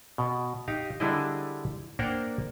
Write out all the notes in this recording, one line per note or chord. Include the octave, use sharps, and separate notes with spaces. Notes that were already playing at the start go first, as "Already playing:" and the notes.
B2
D#4 G4 F5
D3 G3 D4 E4 G#4 D#5
A#3 D4 A#4 C5 F#5 G5